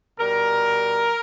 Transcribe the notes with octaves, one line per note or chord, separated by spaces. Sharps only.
B2 G3 A#4